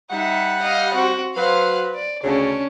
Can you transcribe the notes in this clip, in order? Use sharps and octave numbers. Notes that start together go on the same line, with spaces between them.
G3 D#4 E5 F#5
D#5 F5
C4 F#4
F#3 B4 C5 F5
D5
D2 C#3 C#4 D4